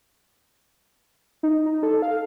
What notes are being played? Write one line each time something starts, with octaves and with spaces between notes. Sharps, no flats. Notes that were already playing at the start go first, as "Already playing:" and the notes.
D#4
D#4
A4
F5